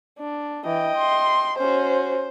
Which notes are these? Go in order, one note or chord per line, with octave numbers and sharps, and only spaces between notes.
D4
E3 D#5 G5
C6
C#4 F#4 C5